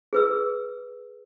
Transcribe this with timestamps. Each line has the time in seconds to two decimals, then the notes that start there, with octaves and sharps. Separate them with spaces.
0.13 G#4 B4 E6